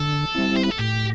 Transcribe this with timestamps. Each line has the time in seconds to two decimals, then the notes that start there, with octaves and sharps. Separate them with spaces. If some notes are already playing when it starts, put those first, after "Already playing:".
Already playing: D3 A4
0.34 G3 C4 E4
0.56 C5
0.64 B4
0.72 A4
0.79 A2 G4